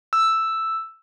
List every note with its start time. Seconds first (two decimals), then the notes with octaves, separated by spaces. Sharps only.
0.13 E6